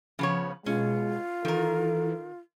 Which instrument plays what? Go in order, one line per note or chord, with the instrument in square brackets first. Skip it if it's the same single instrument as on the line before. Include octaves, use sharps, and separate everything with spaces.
[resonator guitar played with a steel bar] C#3 B3 C#5 [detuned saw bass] F3
[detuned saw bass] B2 [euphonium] G#3 [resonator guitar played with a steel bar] C#4 [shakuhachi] F4
[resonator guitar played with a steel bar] D#3 A#4 [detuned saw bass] E3 [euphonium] A4